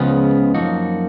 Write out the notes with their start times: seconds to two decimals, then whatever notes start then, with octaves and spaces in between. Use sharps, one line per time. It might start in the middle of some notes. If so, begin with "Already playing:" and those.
Already playing: C#2 C#3 F3 B3
0.54 F#2 F3 A#3 D#4 F#4